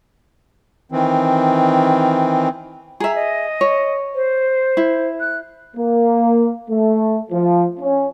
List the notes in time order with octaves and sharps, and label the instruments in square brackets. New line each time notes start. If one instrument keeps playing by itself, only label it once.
[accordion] D#3 E3 C4
[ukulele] G#4 E5 [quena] A#5
[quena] D#5
[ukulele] C#5
[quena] C5
[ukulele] E4
[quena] F#6
[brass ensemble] A#3
A3
F3
C#4